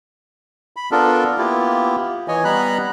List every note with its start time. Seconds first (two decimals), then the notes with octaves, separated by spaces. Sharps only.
0.76 B5
0.91 B3 D4 F4 A4 A#4
1.38 A#3 B3 E4 F4 G4
2.28 E3 C#5 D#5 G#5
2.44 G3 B3 A#5 B5 F#6